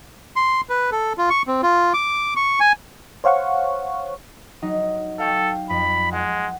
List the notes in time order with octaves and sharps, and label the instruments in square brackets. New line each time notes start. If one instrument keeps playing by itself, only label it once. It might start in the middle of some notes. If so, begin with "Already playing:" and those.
[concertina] C6
B4
A4
F4
C#6
C4
F4
D6
C#6
G#5
[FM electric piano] C5 C#5 F5 F#5 C#6
[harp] F#3 D#4
[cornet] A4 [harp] F5 G5 C#6
[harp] F2 [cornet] B5
[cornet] G#3 [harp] F#5